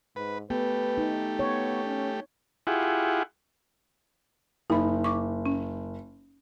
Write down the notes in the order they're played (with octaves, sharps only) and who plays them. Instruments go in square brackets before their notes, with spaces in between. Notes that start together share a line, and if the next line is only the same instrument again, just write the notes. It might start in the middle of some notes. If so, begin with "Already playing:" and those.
[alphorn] G#2 [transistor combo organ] B4
[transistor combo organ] A3 G4 [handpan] B3 [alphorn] B4
[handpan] D#4
[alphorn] B3 [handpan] C#5
[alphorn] C#4
[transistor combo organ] E4 F4 G4 G#4 F#5
[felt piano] F#1 [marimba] D#4 B5
[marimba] C#6 D6
C#4